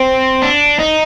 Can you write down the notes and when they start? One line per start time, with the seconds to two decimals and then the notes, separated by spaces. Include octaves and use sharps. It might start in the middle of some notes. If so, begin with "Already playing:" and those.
Already playing: C4
0.42 D4
0.79 D#4